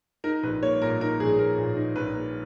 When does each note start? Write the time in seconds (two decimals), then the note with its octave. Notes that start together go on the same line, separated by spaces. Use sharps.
0.24 D#4 A#4
0.43 A#1 B4
0.63 A#3 C#5
0.82 A#2 A#4
1.01 D#4 A#4
1.20 A#1 G#4
1.38 A#3 A#4
1.58 A#2
1.76 D#4
1.96 A#1 B4
2.15 A#3